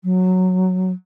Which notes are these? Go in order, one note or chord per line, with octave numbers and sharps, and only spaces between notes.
F#3